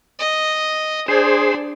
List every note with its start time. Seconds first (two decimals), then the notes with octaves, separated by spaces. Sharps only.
0.19 D#5
1.08 D4 G#4 C5